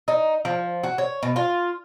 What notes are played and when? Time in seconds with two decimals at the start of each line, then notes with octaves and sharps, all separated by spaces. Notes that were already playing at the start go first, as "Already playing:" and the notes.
0.08 D#4
0.45 F3
0.83 F#4
0.98 C#5
1.23 B2
1.36 F4